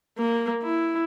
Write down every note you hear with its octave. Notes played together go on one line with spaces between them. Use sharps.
A#3
E4